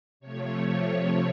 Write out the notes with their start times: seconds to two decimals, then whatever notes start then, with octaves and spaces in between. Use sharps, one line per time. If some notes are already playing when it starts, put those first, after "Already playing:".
0.20 C3 F3 A3 C#5